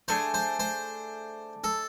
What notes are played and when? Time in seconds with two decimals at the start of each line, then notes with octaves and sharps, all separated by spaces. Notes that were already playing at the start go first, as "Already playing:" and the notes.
0.08 A3 D4 G#4 C5
0.34 C5
0.59 C5
1.64 A4